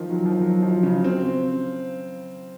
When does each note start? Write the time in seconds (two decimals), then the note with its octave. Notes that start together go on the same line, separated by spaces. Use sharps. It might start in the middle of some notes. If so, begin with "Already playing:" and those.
Already playing: D#3 F3
0.10 F#3
0.26 F3
0.41 F#3
0.63 F3
0.83 C#3
1.04 C4